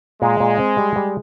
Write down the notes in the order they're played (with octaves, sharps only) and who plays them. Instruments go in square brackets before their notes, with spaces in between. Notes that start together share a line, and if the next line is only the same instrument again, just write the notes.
[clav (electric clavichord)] A#2 [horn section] G#3
[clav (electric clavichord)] A#2
C4
G3
G3